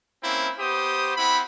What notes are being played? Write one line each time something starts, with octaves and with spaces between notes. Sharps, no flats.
A#3 C4 C#4 E4
B3 G4 C5 D#6
C4 E4 F#5 B5